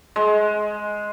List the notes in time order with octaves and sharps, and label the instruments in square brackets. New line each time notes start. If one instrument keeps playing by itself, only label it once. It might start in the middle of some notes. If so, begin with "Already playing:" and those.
[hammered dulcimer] G#3